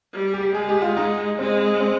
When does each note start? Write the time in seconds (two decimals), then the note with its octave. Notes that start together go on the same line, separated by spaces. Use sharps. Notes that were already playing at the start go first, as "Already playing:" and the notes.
0.13 G3
0.34 G4
0.54 G#3 G#4
0.69 G4
0.82 F4
0.97 D#4
1.38 G#3 C4
1.80 C4